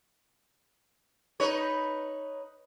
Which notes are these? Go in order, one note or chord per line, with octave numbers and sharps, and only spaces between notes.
D#4 B4 C#5